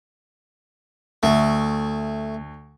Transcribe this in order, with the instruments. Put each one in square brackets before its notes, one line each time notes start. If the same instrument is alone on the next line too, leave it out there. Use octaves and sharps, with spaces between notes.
[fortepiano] D2 [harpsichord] A3